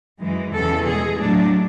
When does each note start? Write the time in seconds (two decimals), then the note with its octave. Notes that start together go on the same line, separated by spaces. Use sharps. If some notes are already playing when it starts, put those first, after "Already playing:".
0.21 F#2 E3 G#3
0.55 E2 C#3 E3 A4
0.88 B2 G#3 G#4
1.21 A2 F#3 A3 D4